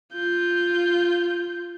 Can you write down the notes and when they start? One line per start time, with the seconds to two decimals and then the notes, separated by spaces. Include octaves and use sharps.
0.12 F4 G6